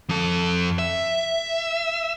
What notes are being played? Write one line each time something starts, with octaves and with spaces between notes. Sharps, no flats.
F2 A4
E5